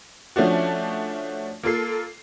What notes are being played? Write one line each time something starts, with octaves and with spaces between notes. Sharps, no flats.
F3 A3 C#4 D4 F#4
A#3 F4 A4 C7